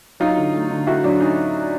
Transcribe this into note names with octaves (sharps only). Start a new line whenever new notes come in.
F#3 D#4 F4
D3
A3
D3
A3 E4 F#4
F#3 D4
C#4 D#4